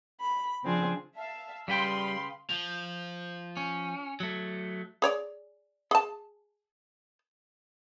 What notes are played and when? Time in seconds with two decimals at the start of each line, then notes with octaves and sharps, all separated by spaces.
0.21 B5
0.63 C#3 F3 C4 D4 F4 G#4
1.16 E5 F5 A5
1.68 C#3 G3 B4 F5 G5 B5 C6
2.50 F3
3.57 C#4
4.20 F#3 A3
5.02 G#4 C#5 D5
5.91 G#4 A5